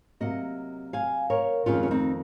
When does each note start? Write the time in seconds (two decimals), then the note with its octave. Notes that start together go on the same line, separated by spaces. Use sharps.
0.20 C3 F#3 A#3 D#5 F#5
0.93 F5 G#5
1.30 A#4 C#5
1.66 F2 D#3 G#3 C#4 F4
1.83 C#4
1.91 C4 D#4